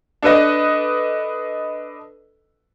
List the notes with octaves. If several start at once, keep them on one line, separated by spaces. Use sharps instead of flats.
D4 A4 B4 D#5